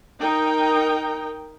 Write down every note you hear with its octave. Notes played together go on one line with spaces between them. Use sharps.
D#4 A#4 G5